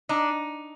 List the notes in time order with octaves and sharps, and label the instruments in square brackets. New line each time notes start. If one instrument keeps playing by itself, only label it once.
[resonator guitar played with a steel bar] D4 D#4